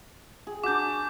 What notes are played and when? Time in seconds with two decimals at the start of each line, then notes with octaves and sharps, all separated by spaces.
0.47 G#4
0.64 D4 F#4 D6 G6